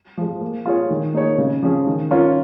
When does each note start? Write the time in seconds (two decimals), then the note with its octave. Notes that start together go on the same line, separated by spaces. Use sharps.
0.17 F3 G#3
0.41 A#3
0.66 F4 G#4 C#5
0.91 D#3
1.14 A#3 D#4 G#4 C#5
1.38 C#3
1.63 F3 C#4 G#4
1.87 D#3
2.11 C#4 F4 A#4 C#5